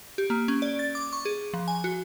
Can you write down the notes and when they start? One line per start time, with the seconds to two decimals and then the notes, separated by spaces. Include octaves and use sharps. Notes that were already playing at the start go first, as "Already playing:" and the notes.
0.18 G4
0.30 A#3
0.48 C#4
0.62 D5
0.79 A6
0.95 D6
1.13 C#6
1.25 G#4
1.53 F3
1.68 G#5
1.84 F#4